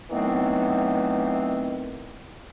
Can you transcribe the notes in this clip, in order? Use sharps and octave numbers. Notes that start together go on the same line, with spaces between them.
D#3 E3 F#3 A3 B3 C4